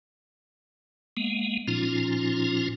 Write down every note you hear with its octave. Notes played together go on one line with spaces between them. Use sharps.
G#3 A#3 B3
A#2 F3 C#4 D#4 F4